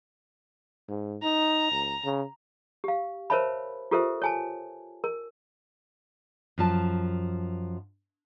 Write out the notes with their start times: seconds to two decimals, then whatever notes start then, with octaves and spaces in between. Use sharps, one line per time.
0.89 G#2
1.23 D#4 A#5
1.72 C#2
2.04 C#3
2.84 G4 F5
3.30 A#4 C5 C#5 E5 A5 B5
3.91 F4 G4 A4 A#4 C5 E5
4.22 C#5 G#5 A5
5.04 A#4
6.58 F#2 F3 A5